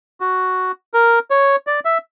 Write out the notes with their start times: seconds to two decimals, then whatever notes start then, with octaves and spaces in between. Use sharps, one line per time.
0.21 F#4
0.94 A#4
1.30 C#5
1.67 D5
1.85 E5